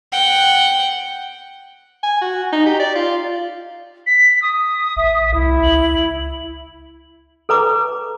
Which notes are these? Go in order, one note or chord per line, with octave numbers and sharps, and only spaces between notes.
F#5 G5
G#5
F#4
D#4
G4
D5
F4
B6
D#6
A1 E5
C2 E4
C#2 F#7
A4 B4 A#5 D6